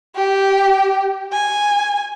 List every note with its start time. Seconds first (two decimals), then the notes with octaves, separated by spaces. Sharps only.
0.16 G4
1.33 G#5